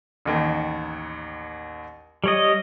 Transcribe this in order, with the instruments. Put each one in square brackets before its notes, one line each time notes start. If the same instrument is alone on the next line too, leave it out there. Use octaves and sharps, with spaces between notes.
[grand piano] A1 D#2 D#3
[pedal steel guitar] G3 C#5 D#5